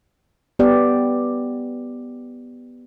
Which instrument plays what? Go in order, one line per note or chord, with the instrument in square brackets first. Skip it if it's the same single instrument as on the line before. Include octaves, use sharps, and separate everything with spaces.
[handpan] B3 G4 D5